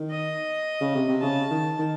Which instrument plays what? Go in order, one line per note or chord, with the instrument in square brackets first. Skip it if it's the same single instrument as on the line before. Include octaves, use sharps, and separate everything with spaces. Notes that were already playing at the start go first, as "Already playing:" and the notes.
Already playing: [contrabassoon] D#3
[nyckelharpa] D#5
[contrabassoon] C#3
C3
C3
[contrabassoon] C#3 [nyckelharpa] A5
[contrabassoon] D#3
D#3